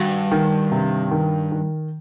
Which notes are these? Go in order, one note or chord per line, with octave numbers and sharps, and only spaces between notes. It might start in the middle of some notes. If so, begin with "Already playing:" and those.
Already playing: G2 D#3 F#4
D#3
C3
D#3
D#3